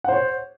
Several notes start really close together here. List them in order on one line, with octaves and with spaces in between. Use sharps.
F#5 C5 C#5